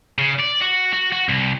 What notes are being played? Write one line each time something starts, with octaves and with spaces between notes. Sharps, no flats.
C#3
D5
F#4
F#4
F#4
C2